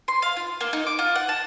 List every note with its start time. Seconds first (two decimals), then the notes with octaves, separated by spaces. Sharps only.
0.08 C6
0.22 F5
0.37 F4
0.61 A#3
0.73 D#4
0.87 D6
0.99 F4
1.15 F#5
1.29 A5